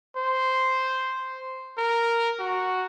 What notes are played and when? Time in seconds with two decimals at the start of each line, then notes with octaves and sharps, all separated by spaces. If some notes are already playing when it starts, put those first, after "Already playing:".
0.17 C5
1.78 A#4
2.39 F#4